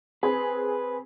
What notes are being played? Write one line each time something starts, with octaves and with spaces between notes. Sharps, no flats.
C4 G#4 B4